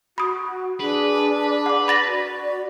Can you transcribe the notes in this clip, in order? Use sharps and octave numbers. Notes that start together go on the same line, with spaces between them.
F#4 B5 D#6
D4 G#4 B4
F#5 D6
B5 A6 A#6
F#4 D5